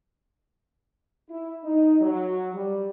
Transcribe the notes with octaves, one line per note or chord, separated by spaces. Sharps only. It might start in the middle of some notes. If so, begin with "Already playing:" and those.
E4
D#4
F#3
G3